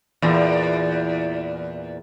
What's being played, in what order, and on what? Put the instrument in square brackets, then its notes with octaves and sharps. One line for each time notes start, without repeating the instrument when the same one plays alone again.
[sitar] E2 A#2